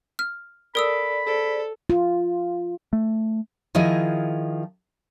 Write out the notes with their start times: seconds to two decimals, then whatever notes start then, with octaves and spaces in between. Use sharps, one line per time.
0.19 F6
0.75 A4 A#4 D5 B5 D#6 E6
1.26 G#4 A4 C5 D5
1.90 F4
2.93 A3
3.75 D#3 F3 E4 G#4 D#5